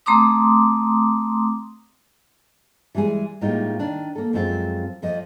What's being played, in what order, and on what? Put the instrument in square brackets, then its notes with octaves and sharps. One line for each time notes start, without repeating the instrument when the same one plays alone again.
[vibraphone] A3 C4 A#5 C6 D6 D#6
[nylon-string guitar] E3 G3 G#3 G#4
A2 G3 G#3 A#3 D#4 F4
D#3 D4
A#3 A4
F#2 F3 G#3 C4 F4
F2 F3 D#5